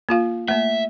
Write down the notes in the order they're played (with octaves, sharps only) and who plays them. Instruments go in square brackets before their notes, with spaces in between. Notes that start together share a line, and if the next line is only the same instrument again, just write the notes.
[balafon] A#3 F4 F5
[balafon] A3 A#3 [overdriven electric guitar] E5